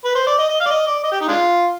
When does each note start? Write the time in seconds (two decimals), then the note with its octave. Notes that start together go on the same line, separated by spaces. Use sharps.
0.05 B4
0.15 C5
0.27 D5
0.38 D#5
0.49 D#5
0.60 F5
0.66 D5
0.70 D#5
0.87 D5
1.04 D#5
1.12 G4
1.20 D#4
1.28 G#3 D4 F4